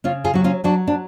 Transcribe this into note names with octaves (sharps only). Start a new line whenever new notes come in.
C#3 C#4 F4
F4 G#4
F#3 F#4
C#4 F4
F#3 D4 F#4
D4